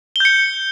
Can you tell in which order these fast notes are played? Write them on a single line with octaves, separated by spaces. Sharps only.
G7 G6 C#7